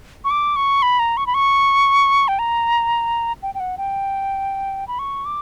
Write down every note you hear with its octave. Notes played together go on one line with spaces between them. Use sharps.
C#6
D6
C#6
B5
A#5
C#6
B5
C#6
G5
A#5
G5
G5
F#5
G5
B5
C#6
D6